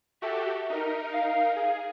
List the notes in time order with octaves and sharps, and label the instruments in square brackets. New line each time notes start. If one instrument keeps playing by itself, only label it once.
[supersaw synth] F#4 G4 A4 [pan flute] E5
[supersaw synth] D#4 A#4
[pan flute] F5
[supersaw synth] G#4